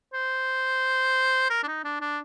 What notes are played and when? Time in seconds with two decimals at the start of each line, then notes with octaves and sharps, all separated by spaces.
0.14 C5
1.50 A#4
1.63 D4
1.68 D#4
1.84 D4
2.01 D4